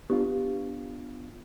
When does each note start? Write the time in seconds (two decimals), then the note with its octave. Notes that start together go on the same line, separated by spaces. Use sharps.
0.10 B3 D4 F4 G4